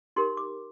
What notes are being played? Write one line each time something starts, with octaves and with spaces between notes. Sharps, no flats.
D#4 G4 A#4 C6
D6